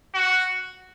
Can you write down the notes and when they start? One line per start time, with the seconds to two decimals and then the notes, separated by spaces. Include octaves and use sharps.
0.14 F#4